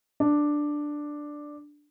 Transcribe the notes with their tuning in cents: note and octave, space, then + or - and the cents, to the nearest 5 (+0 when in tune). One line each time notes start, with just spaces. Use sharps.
D4 +5